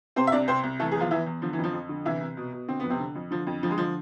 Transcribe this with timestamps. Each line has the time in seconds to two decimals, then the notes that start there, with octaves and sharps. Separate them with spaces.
0.16 C3 C4 C5
0.27 E5
0.32 C2 D4 D5
0.48 C2 C4 C5
0.64 C2
0.80 E3 A3 A4
0.92 G#4
0.95 E2 F3 F4
1.11 E2 E3 E4
1.26 E2
1.42 D3 F3
1.53 E3
1.58 F2
1.64 F3
1.73 F2
1.89 D3
2.05 C2 E3 E4
2.21 C2
2.37 B2
2.53 B2
2.68 D3 C4
2.80 F2 B3
2.90 C3 C4
3.00 D3
3.15 F2
3.31 D3 F3
3.47 F2
3.63 D3 F3
3.71 G#3
3.78 D3 F3